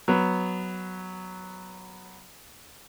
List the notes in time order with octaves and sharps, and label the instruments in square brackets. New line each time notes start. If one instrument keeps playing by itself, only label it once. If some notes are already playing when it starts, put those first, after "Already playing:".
[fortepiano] F#3 B3